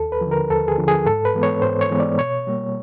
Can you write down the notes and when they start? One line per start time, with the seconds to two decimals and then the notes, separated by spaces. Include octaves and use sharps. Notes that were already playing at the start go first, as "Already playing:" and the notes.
Already playing: D#2 A4
0.12 B4
0.21 D3 F3
0.31 A#4
0.50 D#2 A4
0.68 G#4
0.78 D3 F3
0.88 G#4
1.06 G#2 A4
1.25 B4
1.34 E3 G#3 B3
1.43 C#5
1.62 G#2 C5
1.81 C#5
1.90 E3 G#3 B3
2.00 D5
2.18 B2 C#5
2.47 G3 A#3